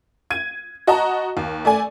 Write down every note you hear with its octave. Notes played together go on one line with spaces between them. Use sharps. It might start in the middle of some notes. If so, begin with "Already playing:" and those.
G#6 D#7
F#4 D#5 A5 A#5
D#2
A3 D5 G#5